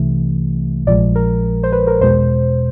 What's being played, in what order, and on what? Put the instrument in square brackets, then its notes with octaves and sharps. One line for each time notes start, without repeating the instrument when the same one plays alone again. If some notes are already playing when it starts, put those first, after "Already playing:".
Already playing: [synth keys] C2 C3 E3 A3
A#1 A#2 F3 G#3 D5
A#4
C5
B4
A#4
E2 B2 G#3 C5